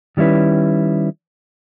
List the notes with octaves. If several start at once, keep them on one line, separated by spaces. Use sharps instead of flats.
D#3 G3 C#4 E4 B4